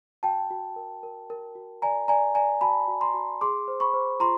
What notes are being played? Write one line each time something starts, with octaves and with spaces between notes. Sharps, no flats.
F#4 G5 A5
F#4
A#4
A#4
A#4
F#4
D5 G#5 A#5
D5 G#5 A#5
D5 G#5 A#5
F#4 A5 B5
F#4
A#5 C6
F#4
G#4 C6 D6
C5
B5 C#6
C5
F4 A#5 C6